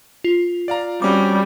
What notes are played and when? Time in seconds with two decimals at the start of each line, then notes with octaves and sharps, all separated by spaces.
0.24 F4
0.68 D5 F5 A#5
1.02 G3 C4 C#4 F#4 D6